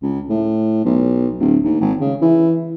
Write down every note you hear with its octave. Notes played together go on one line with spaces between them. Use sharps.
C#2
A2
B1
D1
D#2
G#1
C#3
E3